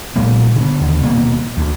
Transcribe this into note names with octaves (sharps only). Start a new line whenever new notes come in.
B1 A#2 G#3 A#3
D3 B3
D#2 D3
D#1 B2 A#3 C4
D2